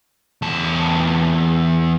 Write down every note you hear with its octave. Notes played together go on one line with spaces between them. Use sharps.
E2 A5